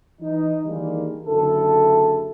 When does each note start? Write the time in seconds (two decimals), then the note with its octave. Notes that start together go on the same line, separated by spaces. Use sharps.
0.21 E3 D#4
0.65 D#3 E3 G3 G#3 A#3 D4
1.26 F#1 D3 E4 A4